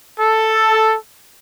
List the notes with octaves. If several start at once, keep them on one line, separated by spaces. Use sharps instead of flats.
A4